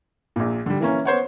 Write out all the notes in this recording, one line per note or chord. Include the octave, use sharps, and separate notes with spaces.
A#1 A#2
D3 G3
E3 A#3 C#4
B3 C5 C#5 F#5